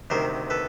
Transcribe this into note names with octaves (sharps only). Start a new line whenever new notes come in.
D2 C3 D#3 A#4 C5
A4 B4